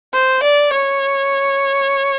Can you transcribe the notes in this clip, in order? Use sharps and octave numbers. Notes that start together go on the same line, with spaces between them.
C5
D5
C#5